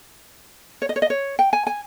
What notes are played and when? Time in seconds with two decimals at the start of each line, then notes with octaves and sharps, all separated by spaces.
0.82 C#5
0.89 D#5
0.96 C#5
1.02 D#5
1.10 C#5
1.39 G5
1.53 G#5
1.67 G#5